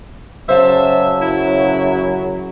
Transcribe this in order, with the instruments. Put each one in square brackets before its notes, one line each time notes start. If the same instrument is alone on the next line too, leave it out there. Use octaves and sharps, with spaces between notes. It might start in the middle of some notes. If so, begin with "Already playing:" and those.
[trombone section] F#2 C#3 F#3 [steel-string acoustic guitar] C5 F5 A5 [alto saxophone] E5
[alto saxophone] E4